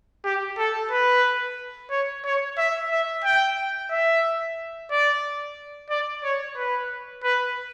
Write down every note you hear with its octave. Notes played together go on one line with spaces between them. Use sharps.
G4
A4
B4
C#5
C#5
E5
E5
G5
E5
D5
D5
C#5
B4
B4